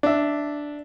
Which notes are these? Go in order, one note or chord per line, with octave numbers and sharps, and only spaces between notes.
D4 E5